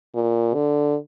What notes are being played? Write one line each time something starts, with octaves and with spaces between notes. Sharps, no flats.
A#2
D3